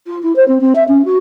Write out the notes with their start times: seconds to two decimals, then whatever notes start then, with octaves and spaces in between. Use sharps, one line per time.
0.07 F4
0.23 E4
0.36 C5
0.48 C4
0.61 C4
0.75 E5
0.88 C#4
1.05 F#4